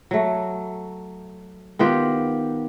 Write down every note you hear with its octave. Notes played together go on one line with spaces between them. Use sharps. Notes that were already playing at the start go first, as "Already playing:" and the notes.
F#3 A3
D#3 B3 F4 G4